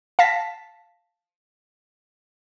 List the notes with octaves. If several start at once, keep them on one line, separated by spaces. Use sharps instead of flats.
F5 A5 A#6 B6